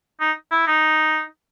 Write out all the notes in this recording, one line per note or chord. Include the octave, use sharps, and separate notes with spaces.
D#4
E4
D#4